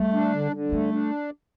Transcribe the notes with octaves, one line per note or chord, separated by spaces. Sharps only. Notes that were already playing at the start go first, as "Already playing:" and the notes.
Already playing: G3 A3
D4
D3
D3
G3 A3
D4